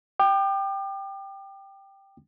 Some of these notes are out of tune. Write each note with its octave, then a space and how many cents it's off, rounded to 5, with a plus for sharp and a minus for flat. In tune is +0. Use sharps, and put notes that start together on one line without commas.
G5 +0 D6 +40